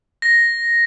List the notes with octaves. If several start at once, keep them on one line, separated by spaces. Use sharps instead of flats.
A#6